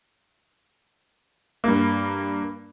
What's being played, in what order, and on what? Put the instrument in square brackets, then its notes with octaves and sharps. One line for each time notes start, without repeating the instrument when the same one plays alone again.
[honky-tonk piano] G2 A#3